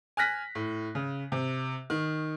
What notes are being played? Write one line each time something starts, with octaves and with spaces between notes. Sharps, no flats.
G#5 F6 F#6 A#6 B6
A2
C#3
C3
D#3